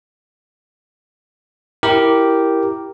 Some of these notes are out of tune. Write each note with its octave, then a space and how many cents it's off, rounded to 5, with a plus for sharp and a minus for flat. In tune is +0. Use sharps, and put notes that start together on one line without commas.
E4 +0 G4 -5 A#4 +0